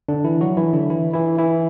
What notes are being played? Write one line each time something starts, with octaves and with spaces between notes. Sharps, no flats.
D3 D4
E3 E4
F#3 F#4
E3 E4
D3 D4
E3 E4
E3 E4
E3 E4